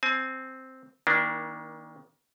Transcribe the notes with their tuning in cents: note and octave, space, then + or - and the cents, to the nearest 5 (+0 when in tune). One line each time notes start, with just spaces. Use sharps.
C4 +0 G#5 +35
D#3 +35 A#3 +25 D4 +0